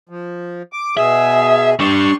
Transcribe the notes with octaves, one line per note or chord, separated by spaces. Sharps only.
F3
D6
B2 G#4 E5
G3 D4 C6 C#6